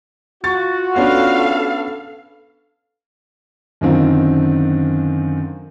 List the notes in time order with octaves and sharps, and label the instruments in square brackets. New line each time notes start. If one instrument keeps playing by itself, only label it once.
[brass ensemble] F4 F#4 [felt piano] C#6 A6
[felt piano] B3 C#4 D4 [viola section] A4 F5
[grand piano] F#2 D3 D#3 C4 F4